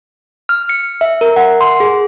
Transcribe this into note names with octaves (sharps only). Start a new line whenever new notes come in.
F6
C#7
E5
A#4
F#5
C6
G#4